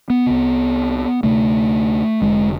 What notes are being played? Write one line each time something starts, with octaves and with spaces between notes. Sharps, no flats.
B3
C2 C3
D2 C3 A3
F1 F2 D3 G#3